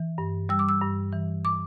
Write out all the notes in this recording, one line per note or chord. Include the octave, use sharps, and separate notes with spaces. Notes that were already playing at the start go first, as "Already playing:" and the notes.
Already playing: E3
G2
G3 E6
D6
E6
G2
E3
D6